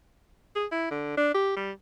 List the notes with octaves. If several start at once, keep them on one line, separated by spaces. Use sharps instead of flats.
G#4
E4
D3
D4
G4
G3